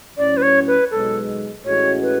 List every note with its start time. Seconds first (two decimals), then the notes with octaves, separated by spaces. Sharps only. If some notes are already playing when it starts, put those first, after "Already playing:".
0.18 A2 F#3 C#4 D5
0.37 B4
0.42 C#5
0.67 B4
0.91 B1 B2 G#3 A4
1.65 A1 A2 G#3 C#4 F#4 C#5
2.02 B4